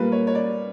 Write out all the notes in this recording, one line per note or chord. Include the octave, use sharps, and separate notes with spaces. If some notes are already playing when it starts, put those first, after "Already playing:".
Already playing: A#2 G3 A#3 B4
C#5
C#5
D5